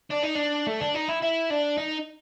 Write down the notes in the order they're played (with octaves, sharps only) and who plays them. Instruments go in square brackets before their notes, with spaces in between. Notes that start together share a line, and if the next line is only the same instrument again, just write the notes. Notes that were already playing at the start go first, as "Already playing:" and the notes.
[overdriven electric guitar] D4
D#4
D4
A3
D4
D#4
E4
E4
D4
D#4